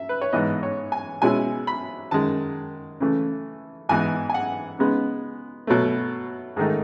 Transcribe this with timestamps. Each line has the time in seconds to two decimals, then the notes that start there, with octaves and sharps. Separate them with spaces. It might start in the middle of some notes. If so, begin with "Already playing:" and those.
Already playing: E5
0.09 B4
0.21 C#5
0.33 G#2 E3 B3 D#5
0.63 C#5
0.92 G#5
1.22 B2 G#3 C#4 E4 G#5
1.67 B5
2.11 F#2 D#3 G#3 A5
3.00 C#3 E3 A3
3.89 G#2 E3 B3 D#4 G#5
4.30 G#5
4.34 F#5
4.79 C#3 G#3 B3 D#4
5.67 B2 F#3 A3
6.56 G#2 D#3 A3 D#4 G#4